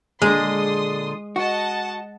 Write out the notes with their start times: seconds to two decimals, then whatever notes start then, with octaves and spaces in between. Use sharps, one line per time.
0.22 A#2 D3 G#3 D4 C6 D#6
1.36 F#4 D#5 F#5 A5